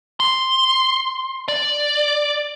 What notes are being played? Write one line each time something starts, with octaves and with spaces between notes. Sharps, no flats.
C6
D5